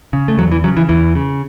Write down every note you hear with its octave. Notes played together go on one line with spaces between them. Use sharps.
C#3
A3
E2 F#3
E3
C#3 F#3
E3
E2 E3
C#3